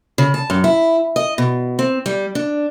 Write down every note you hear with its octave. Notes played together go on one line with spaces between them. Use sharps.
C#3
A5
F#2
E4
D#5
B2
C4
G3
D4